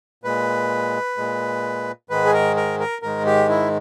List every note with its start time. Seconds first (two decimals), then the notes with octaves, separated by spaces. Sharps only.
0.24 A#2 G#3 B4
1.17 A#2 G#3
2.10 G#2 D#3 G#3 B4
2.25 G#4
2.33 A#4
2.56 A#4
2.80 A#4
3.02 G#2 D#3 G#3 A#4
3.26 G4
3.49 E4